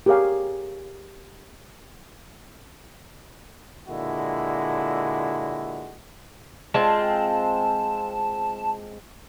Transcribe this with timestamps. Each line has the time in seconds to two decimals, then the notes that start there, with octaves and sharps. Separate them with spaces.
0.06 G4 G#4 A#4 C#5 F5 G#5
3.88 A#2 D3 G#3 E4 F#4
6.74 G#3 C4 F4 A5